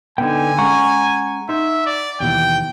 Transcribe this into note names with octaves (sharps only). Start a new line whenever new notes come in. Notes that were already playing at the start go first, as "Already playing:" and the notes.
D3 B3 D#4 G5 G#5
G#3 C#4 F#5 A#5 C#6
D#4 E5 C6
D5
D#2 B2 E3 G5